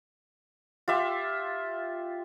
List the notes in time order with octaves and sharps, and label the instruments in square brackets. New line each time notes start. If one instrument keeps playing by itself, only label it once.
[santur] F4 G4 E5 C6